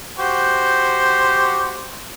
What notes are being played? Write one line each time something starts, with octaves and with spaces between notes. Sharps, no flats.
F#4 G4 C5